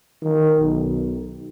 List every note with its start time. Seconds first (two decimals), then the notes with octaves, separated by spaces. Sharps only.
0.23 D#3
0.60 B1